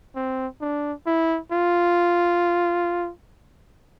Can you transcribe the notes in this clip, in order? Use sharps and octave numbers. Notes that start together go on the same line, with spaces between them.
C4
D4
E4
F4